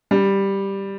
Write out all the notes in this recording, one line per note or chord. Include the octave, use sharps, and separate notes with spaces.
G3